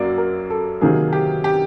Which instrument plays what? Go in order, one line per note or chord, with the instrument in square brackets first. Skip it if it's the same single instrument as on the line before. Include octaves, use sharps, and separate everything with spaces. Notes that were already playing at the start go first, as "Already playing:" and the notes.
Already playing: [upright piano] F#2 F#3 A#3 D5
A#4
A4
C3 D#3 F#3 A#3 G#4
G4
G4